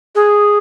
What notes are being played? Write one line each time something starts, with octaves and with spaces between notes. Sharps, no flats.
G#4